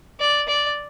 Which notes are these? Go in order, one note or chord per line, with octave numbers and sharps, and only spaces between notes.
D5
D5